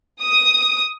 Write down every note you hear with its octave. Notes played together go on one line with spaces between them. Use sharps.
D#6